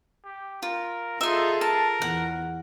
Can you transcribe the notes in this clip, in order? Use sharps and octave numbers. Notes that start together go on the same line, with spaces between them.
G4
F4 A#4
D#4 F4 G#4 A4 E5 C6
A#4 A5
E2 F#5